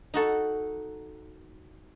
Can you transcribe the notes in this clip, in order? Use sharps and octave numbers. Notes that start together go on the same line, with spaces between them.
D#4 F#4 A4